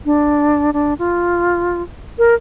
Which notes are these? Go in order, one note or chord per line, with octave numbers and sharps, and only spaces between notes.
D4
D4
F4
A#4